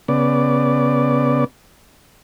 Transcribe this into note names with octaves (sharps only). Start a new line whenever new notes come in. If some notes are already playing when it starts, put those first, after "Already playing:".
C#3 B3 D5